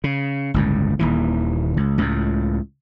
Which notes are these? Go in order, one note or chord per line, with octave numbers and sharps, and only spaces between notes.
C#3
G1 C#2 A2
D#1 D#2 E3
C#2
C#2 A2